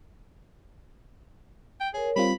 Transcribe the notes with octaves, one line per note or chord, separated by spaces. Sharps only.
G5
G#4 A#4 C#5
G3 C4 F4 B5